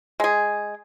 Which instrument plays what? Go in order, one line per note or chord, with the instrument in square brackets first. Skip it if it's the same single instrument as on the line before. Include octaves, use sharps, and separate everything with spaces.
[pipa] G#3 G#4